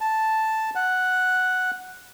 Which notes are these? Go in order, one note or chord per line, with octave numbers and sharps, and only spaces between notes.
A5
F#5